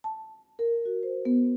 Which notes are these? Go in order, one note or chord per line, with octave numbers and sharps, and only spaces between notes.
A5
A#4
F#4
C5
B3